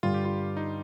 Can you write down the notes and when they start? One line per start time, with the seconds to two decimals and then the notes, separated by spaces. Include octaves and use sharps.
0.03 G2 D3 G3 F4
0.14 G4
0.25 F4
0.57 D#4